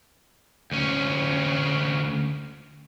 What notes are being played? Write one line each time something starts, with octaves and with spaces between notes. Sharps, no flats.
D2 C#4